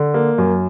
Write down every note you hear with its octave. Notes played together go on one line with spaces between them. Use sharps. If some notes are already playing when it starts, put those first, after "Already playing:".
Already playing: D3
A#3
F#2